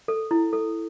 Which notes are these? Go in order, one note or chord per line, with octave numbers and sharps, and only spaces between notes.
A4
E4
A4